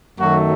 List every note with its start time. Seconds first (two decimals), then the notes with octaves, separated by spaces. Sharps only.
0.17 F#2 D#3 F#3 A3 F#4